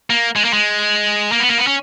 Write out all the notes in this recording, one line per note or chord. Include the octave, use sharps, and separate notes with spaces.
A#3
G#3
A#3
G#3
A#3
B3
A#3
B3
C#4